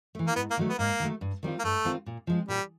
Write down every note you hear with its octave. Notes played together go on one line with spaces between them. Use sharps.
E3 A3
A#3
G#2 B3
A#3
D#3 F#3 A3
B3
G#2 A#3
D#3 F#3 A3
G2
D#3 G3 C4 F4
A#3
G2 A3
D#3 G3 C4 F4
A#2
F3 G#3 C4
A#2 G3